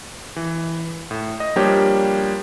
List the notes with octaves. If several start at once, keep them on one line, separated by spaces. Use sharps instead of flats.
E3
A2
D#5
F3 G3 A#3 D4 G4 C#5